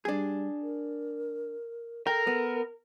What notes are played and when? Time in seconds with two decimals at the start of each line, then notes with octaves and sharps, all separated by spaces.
0.05 G3 D4 G#4
0.62 A#4
2.07 A4 A#4 G5
2.27 B3